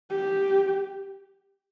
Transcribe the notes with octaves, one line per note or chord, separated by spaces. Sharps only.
G4